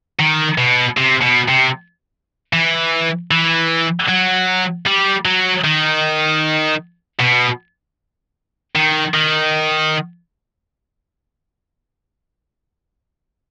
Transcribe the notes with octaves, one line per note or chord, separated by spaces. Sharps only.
D#3
B2
C3
B2
C3
E3
E3
F#3
G3
F#3
D#3
B2
D#3
D#3